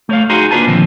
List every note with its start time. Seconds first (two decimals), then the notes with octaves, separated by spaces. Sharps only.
0.09 A3 C#5 F5
0.30 D#4 F#4 G#4 G#5 A#5 C6
0.51 A#3 D4 F4 B4 G#5 A5
0.67 A#2 D3 D#3 F3 C4